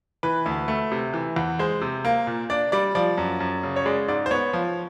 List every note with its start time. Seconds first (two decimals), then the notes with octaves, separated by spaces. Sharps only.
0.23 E3 B4
0.46 D2
0.68 A3
0.92 C3
1.14 E3
1.36 E2
1.59 G#3 C5
1.81 C3
2.05 A#3
2.27 A#2
2.50 D4 D5
2.72 G3 D5
2.95 F3 D5
3.18 F#2
3.40 F#2
3.63 C#3
3.76 C#5
3.86 G#3 D5
4.08 G#2 D5
4.26 C5
4.31 B3 C#5
4.53 F3